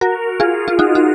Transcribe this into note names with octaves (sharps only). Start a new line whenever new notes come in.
F#4 A#4
F4 G#4
F4
D#4 F#4
F#4